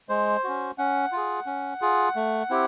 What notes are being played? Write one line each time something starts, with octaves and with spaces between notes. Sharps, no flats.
G#3 C5
C#4 F#4
C#4 F#5
F4 G#4
C#4
F4 G#4
A3
C4 E4 G4